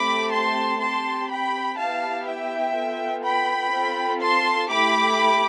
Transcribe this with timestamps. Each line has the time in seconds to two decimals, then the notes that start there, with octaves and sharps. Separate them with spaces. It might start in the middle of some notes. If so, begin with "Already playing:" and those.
Already playing: A3 C4 G4 B5 D6
0.31 A5 C6
0.80 C4 G4 A5 C6
1.29 G5 B5
1.77 B3 E4 G4 F5 A5
2.26 E5 G5
2.75 B3 F4 A4
3.23 G5 B5
3.72 C4 F4 A4
4.21 A5 C6
4.69 A3 E4 G4 B5 D6